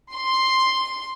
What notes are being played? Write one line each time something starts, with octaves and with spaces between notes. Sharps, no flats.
C6